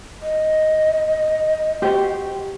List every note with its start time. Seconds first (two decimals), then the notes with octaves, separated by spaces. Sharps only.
0.22 D#5
1.82 F#4 G4 C5